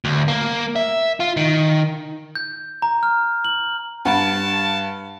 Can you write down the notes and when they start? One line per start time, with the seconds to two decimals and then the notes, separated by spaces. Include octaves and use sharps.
0.05 D2
0.28 A#3
0.76 E5
1.20 F4
1.37 D#3
2.35 G6
2.82 A#5
3.03 F6
3.45 F#7
4.05 G2 F#5 A5 B5 D7